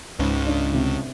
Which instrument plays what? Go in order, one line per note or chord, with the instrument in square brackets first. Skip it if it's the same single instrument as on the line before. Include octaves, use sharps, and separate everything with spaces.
[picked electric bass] C#2 C#3 [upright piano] G#2
[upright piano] D4
C2